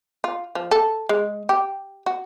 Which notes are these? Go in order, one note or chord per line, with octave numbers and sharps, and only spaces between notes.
F4
F3
A4
G#3
G4
F#4